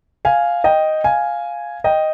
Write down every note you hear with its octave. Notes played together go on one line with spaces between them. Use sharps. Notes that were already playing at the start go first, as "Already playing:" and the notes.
F5 G#5
D#5 G5
F5 G#5
D#5 G5